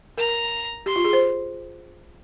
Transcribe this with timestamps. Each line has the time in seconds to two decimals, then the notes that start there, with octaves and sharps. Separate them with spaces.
0.18 A#4 A#5
0.86 G4 C6
0.96 F4
1.04 G#4
1.13 C5